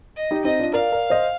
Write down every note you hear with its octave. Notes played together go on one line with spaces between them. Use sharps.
D#5
D#4 G4
C4 D#4 D#5
D4 F4
A#4 D5 F5
A#4 D5
C5 D#5